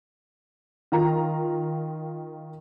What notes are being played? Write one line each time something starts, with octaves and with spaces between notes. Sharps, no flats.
D#3 F4 A#5